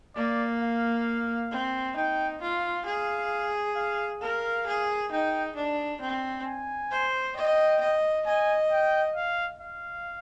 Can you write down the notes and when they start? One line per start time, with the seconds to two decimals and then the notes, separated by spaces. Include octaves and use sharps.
0.16 A#3 D5
0.61 F5
1.51 C4
1.96 D#4 G5
2.41 F4
2.86 G#4 F5
3.75 F5
4.21 A#4 F5
4.67 G#4
5.11 D#4 G5
5.56 D4
6.01 C4
6.46 G#5
6.91 C5
7.36 D#5 G5
7.81 D#5
8.26 D#5 G#5
8.71 G5
9.16 F5
9.61 F5